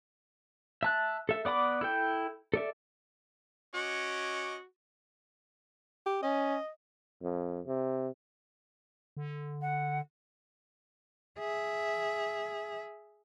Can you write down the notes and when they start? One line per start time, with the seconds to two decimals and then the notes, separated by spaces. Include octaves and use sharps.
0.83 E5 A5 F#6
1.29 A4 E5
1.45 B3 D5 F#5 B5 D6
1.81 E4 A4 G5
2.54 A4 D5 E5
3.74 C#4 F#4 D#5 D6
6.06 G4
6.23 C#4 D#5
7.22 F2
7.66 C3
9.17 D3
9.61 F#5
11.38 G#4 E5